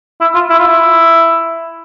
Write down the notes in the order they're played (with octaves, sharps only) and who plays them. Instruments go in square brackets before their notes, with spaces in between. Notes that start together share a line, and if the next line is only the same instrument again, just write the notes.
[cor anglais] E4
F4
E4
F4
E4